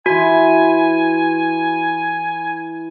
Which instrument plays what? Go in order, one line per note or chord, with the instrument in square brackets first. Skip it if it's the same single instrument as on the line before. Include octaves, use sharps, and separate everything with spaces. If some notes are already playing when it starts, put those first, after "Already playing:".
[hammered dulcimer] E3 C6 [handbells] F#4 [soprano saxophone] G#5